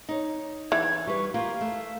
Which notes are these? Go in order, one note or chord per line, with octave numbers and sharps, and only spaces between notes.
D#4 C#5
E3 G#6
G3 B4 C#6
A#3 F4 G4 F5
A3